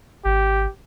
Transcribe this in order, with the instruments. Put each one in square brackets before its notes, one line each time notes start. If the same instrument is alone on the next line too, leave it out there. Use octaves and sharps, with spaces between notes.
[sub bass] G#1 [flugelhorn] G4